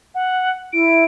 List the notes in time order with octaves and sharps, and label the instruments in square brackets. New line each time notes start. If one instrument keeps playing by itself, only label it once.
[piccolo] F#5
[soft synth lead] E4 [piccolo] D7